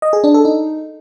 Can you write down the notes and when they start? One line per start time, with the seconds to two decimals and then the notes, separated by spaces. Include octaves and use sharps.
0.02 D#5
0.13 G#4
0.24 D4
0.34 A4
0.45 D#4